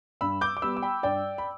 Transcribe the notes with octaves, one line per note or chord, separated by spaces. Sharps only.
G2 B5 E6
D6 G6
D6
G3 B3 B5 E6
D6
G5 B5
G2 D5 G5
B5